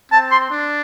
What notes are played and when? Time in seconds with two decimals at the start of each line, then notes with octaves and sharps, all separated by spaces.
0.12 C4 A5
0.31 C6
0.50 D4